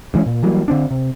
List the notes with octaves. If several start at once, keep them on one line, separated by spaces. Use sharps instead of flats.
G2 E3 G#3 C#4
A#2
E3 F#3 G3 A#3
D3 C4 D4
C3